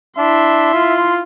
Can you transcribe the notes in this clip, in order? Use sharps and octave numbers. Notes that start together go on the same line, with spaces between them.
D4 E4 E5 C6
F4